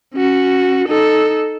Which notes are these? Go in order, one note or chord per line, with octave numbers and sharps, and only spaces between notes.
C#4 F#4
D#4 A4